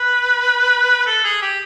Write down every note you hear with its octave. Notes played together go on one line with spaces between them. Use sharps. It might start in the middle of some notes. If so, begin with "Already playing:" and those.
Already playing: B4
A4
G#4
G4